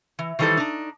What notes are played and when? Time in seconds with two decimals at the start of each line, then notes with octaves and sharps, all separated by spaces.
0.19 E3
0.39 D#3 E3 G3 D#4 A4 C5
0.57 D4 D#4